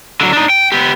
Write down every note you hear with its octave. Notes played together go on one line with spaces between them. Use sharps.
D3 F#3
D4 D#4
G5
B3 G4